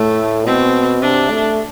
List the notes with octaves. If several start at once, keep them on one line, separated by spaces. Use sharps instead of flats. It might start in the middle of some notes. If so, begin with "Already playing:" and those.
Already playing: A2 A3
B2 C4
C3 D4
A3